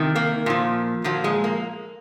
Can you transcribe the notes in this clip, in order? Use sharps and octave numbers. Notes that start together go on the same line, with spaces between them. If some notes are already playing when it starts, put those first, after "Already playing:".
Already playing: C3 D#3
A#3
A#2 F3
A#2 F3 F#3
G#3
A#3